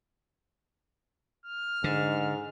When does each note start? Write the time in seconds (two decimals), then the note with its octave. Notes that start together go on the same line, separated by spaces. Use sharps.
1.46 F6
1.84 G#2 D3